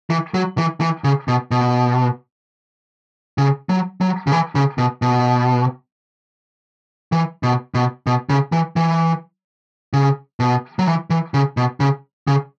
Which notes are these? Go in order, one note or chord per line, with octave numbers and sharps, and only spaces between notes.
E3
F#3
E3
E3
C#3
B2
B2
C#3
F#3
F#3
C#3
E3
C#3
B2
B2
E3
B2
B2
B2
C#3
E3
E3
C#3
B2
F#3
E3
E3
C#3
B2
C#3
C#3